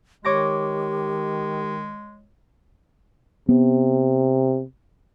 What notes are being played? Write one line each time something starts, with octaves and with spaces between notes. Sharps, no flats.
D#3 G#3 G4 C#5 D6 A#6
C3 B3